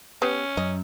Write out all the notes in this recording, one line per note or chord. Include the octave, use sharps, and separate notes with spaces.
B3 C#4 G4
F#2 D#5